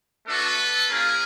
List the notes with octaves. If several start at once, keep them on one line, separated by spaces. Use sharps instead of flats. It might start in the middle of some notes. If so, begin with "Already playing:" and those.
A3 D4 F#4 A4 B4
A#3 C#4 F4 G#4 A#4